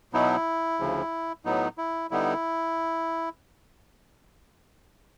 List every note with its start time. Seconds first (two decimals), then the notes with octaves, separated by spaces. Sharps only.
0.13 B2 F#3 B3 D#4 E4
0.79 D2 C#3 F3
1.45 A2 F#3 B3 D#4
1.78 E4
2.11 D3 G3 B3 D#4 E4